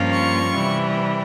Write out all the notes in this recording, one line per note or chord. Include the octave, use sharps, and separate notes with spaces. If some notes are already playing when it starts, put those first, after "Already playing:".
Already playing: G2 F3 A#3 C#4 F4
C#6
C3 E3 G3